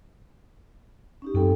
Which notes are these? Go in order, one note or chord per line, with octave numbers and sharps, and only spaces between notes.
C#4 D#4 G4
F#2 C4 A4 G5